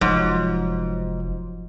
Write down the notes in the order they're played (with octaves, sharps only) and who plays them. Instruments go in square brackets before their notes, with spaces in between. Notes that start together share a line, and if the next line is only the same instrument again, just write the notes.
[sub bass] F1 [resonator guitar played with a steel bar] G#2 [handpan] F3 F#3